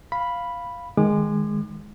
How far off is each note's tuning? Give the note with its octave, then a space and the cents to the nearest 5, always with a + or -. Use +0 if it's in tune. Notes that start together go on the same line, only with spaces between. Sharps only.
F5 +0 B5 +0
D#3 +0 G#3 +0 D6 +40